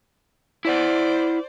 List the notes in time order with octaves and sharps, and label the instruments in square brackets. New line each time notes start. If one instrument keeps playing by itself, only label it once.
[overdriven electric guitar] E4 F#5 [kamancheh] C5 D5